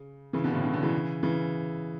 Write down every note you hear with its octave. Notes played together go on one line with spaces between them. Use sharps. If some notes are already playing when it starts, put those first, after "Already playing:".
Already playing: C#3
C#3 E3
B2 D3
A2 C#3
B2 D3
B2 D3
C#3 E3
C#3 E3